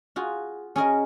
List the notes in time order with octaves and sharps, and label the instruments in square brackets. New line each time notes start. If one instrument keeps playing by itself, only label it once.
[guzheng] F4 F#4 G#4
C#4 G#4 A#4 D#5